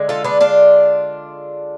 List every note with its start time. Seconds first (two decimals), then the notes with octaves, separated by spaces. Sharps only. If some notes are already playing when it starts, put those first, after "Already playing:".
Already playing: D3 G#3
0.09 F4 A4
0.24 B3 D4
0.40 D4 F4